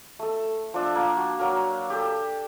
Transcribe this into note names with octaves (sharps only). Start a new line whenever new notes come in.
A3 A4
F3 D4 E6
A#3
F#4
F#3 A#3 A#4
G4 A4